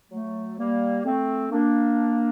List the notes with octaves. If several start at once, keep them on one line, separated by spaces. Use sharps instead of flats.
F#3 A3
G3 A#3
A3 C4
A#3 D4